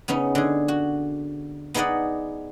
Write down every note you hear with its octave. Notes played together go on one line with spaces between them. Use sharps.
C#3 B3 C#4 D#4
D3 G#4
F#4
B3 D#4 G#4 D5 D#5 F#5